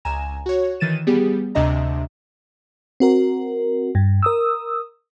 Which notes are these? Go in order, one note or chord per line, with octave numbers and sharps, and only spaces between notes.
C#2 G#5 A#5 E7
F#4 C#5
D#3 E3 A6 D#7 E7
G3 B3 G4 G#4
D2 C3 D4 D#5 E5 A#5
C4 F#4 A#4
G2
A#4 D#6 E6